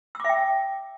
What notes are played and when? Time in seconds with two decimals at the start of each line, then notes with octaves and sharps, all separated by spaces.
0.15 E6
0.20 D6
0.24 E5
0.29 G5